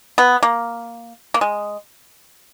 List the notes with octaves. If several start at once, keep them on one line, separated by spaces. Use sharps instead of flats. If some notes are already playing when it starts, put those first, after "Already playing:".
B3
A#3
A#3
G#3